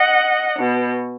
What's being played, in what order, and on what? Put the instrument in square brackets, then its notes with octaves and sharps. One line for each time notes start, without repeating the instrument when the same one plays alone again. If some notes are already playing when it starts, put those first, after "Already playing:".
Already playing: [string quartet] D#5 F#5
B2